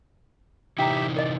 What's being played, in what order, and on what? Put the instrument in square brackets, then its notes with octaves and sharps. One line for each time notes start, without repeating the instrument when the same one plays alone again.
[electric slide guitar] C3 E3 D#4 [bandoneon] G4 E5 [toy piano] G5 A#5
[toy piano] A#4 D#5 [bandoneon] D5